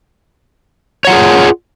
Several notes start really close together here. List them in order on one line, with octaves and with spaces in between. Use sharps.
C#5 F#5 F4 G#4